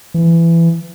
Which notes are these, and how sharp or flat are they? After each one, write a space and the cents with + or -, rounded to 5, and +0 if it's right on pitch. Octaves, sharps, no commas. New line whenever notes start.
E3 +20